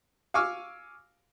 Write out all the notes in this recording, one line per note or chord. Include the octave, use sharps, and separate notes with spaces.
F5 G#5 C#6 D6 E6 F6